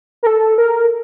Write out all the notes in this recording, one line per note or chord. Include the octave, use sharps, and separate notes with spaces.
A#4
A4
A#4